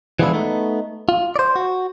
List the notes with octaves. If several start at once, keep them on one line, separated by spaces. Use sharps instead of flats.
E3 F3 G#3 B3 D4 E4
A3 B3 D#4
F4
C5 D5
F#4